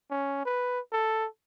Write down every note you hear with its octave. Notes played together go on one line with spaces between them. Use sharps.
C#4
B4
A4